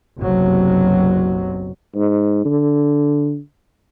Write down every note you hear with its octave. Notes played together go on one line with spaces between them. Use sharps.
F#1 B1 C3 F#3
G#2
D3